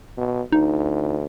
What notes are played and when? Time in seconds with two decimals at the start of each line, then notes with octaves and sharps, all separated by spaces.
0.17 B2
0.52 D2 D#4